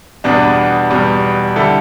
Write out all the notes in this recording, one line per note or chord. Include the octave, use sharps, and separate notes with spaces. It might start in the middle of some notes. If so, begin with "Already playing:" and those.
E2 B2 G3 B3 D4
E2 B2 G3
D3 G3 E4 A4